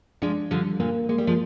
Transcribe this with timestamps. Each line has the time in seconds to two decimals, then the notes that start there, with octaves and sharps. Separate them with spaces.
0.22 F3 G#3 D4
0.51 D3 F3 G3
0.80 A#2 D3 A#3
1.09 G#3 A#3
1.18 G3
1.27 F3 G#3